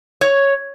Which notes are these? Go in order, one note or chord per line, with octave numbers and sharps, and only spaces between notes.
C#5